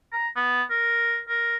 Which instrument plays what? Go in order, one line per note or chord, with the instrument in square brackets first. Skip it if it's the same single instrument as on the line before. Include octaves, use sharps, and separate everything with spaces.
[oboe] A#5
B3
A#4
A#4